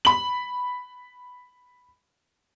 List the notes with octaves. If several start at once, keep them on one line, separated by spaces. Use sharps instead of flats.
B5 F#7